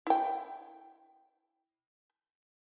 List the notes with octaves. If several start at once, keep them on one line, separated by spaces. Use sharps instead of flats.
E4 G5